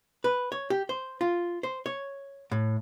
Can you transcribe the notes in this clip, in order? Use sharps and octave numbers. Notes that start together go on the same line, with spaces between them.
B4
C#5
G4
C5
F4
C5
C#5
A2